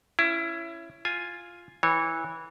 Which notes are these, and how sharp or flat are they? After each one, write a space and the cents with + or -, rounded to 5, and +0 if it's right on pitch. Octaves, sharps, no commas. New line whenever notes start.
C#4 +0 E4 +20
F4 +0 G#5 +0
E3 -15 C#5 -20